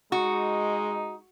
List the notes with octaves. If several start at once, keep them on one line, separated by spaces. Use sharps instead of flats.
G#3 D#4 F#4